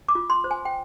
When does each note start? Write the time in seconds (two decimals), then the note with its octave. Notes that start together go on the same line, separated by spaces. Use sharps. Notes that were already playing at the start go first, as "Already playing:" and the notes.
0.08 D6
0.15 F4
0.30 C6
0.44 C5
0.51 G#5
0.65 G5